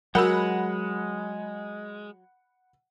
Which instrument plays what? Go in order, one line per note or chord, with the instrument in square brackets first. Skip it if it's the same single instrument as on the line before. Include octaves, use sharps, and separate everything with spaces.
[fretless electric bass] F#3 [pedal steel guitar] G#3 [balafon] F#4 A#4 [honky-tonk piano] F#5 B5